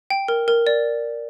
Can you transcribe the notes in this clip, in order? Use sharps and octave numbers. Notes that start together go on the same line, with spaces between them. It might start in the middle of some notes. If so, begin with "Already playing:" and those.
G5
A#4
A#4
D5